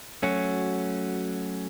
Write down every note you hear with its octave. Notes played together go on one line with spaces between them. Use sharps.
F#3 A3 C#4 F#4